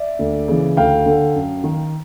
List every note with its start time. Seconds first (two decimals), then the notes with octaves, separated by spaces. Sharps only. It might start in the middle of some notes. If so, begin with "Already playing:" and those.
Already playing: D5 E5
0.19 D2
0.48 C#3 E3
0.77 D2 F5 G5
1.06 D3
1.35 F#2
1.64 D#3